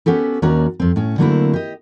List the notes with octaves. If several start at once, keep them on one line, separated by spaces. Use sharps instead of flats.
B3 C#4 F#4 G4 A4
D#2 A#3 C#4 F#4 D5 A#5
F2 C4
A2 C#4
D3 F#3 A3 A#3 C4 E4
G4 D#5